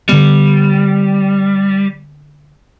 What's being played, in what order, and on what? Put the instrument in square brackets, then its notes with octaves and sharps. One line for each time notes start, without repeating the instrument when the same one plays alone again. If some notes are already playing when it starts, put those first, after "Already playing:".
[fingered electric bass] D3 B3 [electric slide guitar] G3